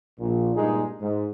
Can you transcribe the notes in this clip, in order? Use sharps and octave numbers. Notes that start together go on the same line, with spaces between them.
A#1 A#2
G2 A#2 G#3 D#4 G#4
G#2